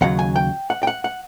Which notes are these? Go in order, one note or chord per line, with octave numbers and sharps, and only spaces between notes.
D#2 C#3 F#3 F#5
G#5
G5
F#5
G5
F#5
F#5